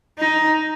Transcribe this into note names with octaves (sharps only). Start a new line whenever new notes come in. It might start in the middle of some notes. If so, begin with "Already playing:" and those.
D#4